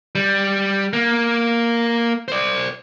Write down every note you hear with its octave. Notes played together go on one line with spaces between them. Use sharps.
G3
A#3
C5 D5